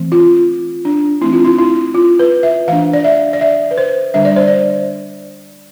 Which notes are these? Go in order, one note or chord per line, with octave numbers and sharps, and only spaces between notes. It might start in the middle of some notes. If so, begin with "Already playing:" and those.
Already playing: E3 A3 C4
F4
D4
E3 A3 C4 E4
F4
E4
E4
F4
B4
E5
E3 A3 D4 F5
D5
E5
D5
E5
B4
C5
D3 G3 D4 E5
D5
C5
D5